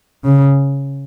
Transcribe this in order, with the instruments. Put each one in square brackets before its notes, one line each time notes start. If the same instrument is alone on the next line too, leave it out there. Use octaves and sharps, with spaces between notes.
[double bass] C#3